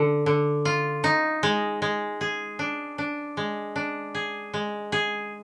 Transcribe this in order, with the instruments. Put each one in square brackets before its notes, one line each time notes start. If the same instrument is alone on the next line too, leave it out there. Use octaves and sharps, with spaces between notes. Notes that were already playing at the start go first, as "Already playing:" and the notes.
Already playing: [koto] D3
D3
F4
D#4
G#3
G#3
G#4
D4
D4
G#3
D4
G#4
G#3
G#4